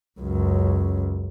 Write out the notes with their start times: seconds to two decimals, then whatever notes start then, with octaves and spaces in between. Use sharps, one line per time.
0.20 C#2 F#2